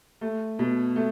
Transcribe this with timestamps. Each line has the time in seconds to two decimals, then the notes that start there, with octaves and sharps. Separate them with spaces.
0.21 A3
0.59 B2
0.96 A3